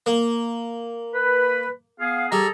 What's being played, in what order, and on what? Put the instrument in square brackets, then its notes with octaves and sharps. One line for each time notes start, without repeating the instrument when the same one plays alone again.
[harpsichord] A#3
[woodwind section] B4
B3 G#4 F5
[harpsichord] G3 [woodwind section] G#4 A4 A#5